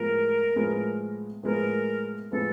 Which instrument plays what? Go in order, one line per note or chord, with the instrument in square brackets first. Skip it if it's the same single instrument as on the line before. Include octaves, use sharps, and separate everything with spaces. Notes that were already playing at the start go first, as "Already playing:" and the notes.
Already playing: [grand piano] A2 F3 G#3 B3 [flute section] A#4
[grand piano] A2 F3 G#3 B3
[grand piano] A2 F3 G#3 B3 [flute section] A#4
[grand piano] A2 F3 G#3 B3 [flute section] A4